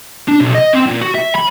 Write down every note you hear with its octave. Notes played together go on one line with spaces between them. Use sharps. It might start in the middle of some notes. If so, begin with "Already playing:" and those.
D4
B1
D#5
C4
A#2
F#4
E5
B5